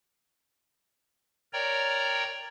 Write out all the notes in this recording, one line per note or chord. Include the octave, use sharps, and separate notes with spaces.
A#4 C#5 D5 G5 A#5